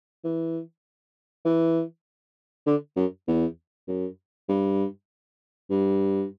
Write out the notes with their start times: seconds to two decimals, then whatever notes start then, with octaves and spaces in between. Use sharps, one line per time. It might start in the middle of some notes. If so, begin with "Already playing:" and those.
0.24 E3
1.45 E3
2.66 D3
2.96 F#2
3.28 E2
3.88 F#2
4.49 G2
5.70 G2